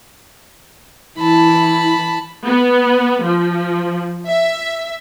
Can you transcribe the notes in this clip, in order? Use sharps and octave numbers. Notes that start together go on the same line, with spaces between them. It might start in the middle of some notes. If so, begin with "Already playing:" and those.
E3 E4 A5 B5
B3
F3
E5